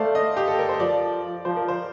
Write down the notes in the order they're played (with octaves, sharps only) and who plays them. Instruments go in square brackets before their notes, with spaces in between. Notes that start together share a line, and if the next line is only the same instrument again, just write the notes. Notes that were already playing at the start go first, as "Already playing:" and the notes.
Already playing: [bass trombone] A3 [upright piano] C5 D5 F5
[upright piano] D#5
G4
A4
A#4
C5
[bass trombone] F3 [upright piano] D5
[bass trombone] F3 [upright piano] C5
[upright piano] A#4
C5